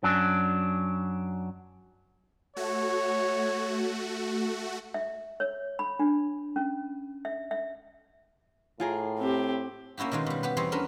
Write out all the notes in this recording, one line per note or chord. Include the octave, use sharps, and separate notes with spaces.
F#2 F#3 D4
A3 F#4 C#5
E5
C#5
B5
D4
C#4
E5
E5
A2 F4 G#4 A#4
C4 G4
A#3 C#4 E4 F#4 G4
B2 D#3 G#3 F4 A#4
B2 G3
B3 G4 B4
E2 G3 C4 C#5 D#5 C6
C#4 D4 A#4 B4